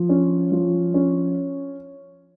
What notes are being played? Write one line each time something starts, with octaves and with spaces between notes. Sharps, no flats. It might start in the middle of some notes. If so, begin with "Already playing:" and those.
Already playing: F3
C#4
F3
C#4